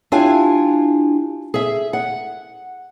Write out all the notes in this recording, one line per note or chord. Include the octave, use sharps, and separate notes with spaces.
D4 E4 F4 G4 G#5
G#4 E5
F#5